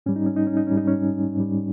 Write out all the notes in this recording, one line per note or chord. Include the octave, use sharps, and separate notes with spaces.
G#2 G3 C#4
D#4
C#4
D#4
C#4
D#4
G#2 G3 C#4
D#4
C#4
G#2 G3